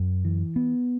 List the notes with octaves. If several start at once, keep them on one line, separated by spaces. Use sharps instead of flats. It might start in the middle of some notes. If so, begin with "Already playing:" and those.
Already playing: F#2
E3
B3